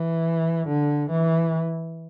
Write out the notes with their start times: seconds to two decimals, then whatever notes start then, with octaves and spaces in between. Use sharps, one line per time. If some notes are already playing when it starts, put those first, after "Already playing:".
Already playing: E3
0.68 D3
1.11 E3